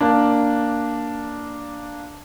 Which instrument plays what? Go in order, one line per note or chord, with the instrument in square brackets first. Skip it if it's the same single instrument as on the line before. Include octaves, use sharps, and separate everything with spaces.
[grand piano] A#3 D4